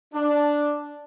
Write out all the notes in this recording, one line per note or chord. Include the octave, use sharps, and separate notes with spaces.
D4